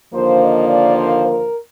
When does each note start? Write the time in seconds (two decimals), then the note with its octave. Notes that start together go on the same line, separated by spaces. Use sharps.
0.13 D#2 D3 F3 A#3 C5
0.41 D#5
0.69 D5
0.97 C5
1.25 A#4